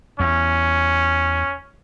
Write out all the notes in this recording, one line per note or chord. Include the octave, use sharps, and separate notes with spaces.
E2 C#4